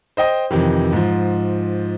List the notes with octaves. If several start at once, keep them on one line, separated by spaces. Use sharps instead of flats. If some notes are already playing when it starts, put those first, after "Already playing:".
C5 D#5 G5 D#6
F2 C3 D#3 E3
G#2 F3